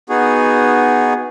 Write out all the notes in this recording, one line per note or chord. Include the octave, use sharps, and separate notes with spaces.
B3 D#4 F#4 G#4